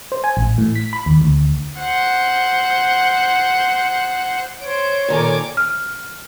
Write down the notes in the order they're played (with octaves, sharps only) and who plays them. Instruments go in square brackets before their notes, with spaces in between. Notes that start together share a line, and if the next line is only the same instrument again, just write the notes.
[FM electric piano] C5
G#5
A1
A2
B6
B5
D#2
D2
[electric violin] C5 F#5
[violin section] C5 D7 [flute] C#5
[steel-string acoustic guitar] A#2 D#3 A4 [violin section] G#5 A#5 D6
[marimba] F6